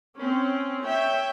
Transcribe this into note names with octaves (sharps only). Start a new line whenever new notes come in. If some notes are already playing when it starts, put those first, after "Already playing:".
C4 C#4
C#5 E5 G5